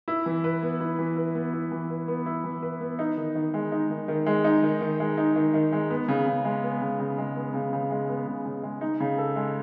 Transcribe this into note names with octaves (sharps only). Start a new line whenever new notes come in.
E4
E3
B4
B3
E4
E3
B4
B3
E4
E3
B4
B3
E4
E3
B4
B3
D#4
D#3
D#3
G#3
D#4
D#3
D#3
G#3
D#4
D#3
D#3
G#3
D#4
D#3
D#3
G#3
B3
C#3
C#3
G#3
B3
C#3
C#3
G#3
B3
C#3
C#3
G#3
B3
C#3
C#3
G#3
D#4
C#3
A4
G#3